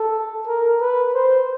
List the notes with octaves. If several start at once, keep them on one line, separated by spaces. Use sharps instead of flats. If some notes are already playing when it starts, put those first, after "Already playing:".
Already playing: A4
A#4
B4
C5